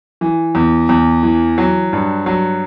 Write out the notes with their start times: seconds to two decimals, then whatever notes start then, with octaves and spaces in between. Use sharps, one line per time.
0.21 E3
0.55 E2
0.89 E2
1.23 E3
1.58 F#3
1.93 G2
2.26 F#3